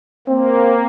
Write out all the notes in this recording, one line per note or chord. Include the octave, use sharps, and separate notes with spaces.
A#3 C4